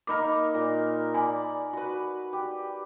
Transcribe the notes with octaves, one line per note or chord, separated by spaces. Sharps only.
A#3 D#4 A#4 B5 D6
A#2
D5 G#5 B5
F#4 B4
G4